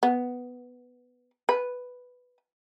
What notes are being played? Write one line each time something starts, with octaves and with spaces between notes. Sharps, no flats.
B3
B4